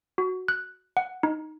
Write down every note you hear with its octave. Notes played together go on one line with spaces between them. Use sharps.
F#4
F#6
F#5
D#4